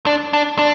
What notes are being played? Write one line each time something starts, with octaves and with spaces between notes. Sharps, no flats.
D4
D4
D4